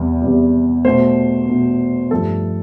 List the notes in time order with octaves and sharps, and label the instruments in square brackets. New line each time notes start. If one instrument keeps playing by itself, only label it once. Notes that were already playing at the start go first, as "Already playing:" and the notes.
Already playing: [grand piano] E2 C3 G3
E2 C3 G3
B2 A3 C5
B2 A3
G2 F3 A3 A4